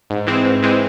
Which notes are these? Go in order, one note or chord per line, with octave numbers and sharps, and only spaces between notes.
G#2
E3 G#3 C4
G#2
E3 G#3 C4